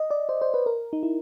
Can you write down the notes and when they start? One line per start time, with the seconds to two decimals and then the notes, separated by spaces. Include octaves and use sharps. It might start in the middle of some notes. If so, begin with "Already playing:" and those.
Already playing: D#5
0.10 D5
0.29 C5
0.42 C5
0.54 B4
0.66 A#4
0.93 D#4
1.03 E4